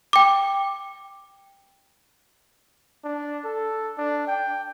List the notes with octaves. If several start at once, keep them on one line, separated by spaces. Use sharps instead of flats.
G5 D6
D4
A4
D4
G5